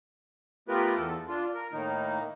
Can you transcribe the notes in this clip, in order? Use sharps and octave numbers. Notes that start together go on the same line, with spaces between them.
A3 B3 F4 G4 A#4 B4
E2 A4
D4 F4
A#4
A2 D#3 A#3 D#4